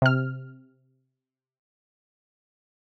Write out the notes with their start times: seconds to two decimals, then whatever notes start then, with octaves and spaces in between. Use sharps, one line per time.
0.02 C3 F6